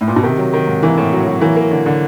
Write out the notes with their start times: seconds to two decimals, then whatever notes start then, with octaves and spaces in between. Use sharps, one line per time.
0.01 A2
0.08 A#2
0.16 B2
0.23 C3 D#3
0.38 F#3
0.54 D#3
0.67 G#2
0.83 E3 A#3
0.98 A2
1.13 F#3
1.27 F#3
1.41 E3 A#3
1.56 A#3
1.71 D3
1.86 D3